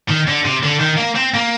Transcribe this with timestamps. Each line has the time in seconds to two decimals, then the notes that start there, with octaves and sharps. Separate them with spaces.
0.09 D#3
0.27 D3
0.45 C3
0.63 D3
0.80 D#3
0.98 A#3
1.15 C4
1.34 A#3